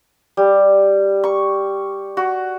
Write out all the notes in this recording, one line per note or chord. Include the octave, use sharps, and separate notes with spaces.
G3
C#6
F#4